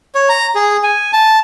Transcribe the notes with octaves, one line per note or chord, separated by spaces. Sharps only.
C#5
A#5
G#4
G#5
A5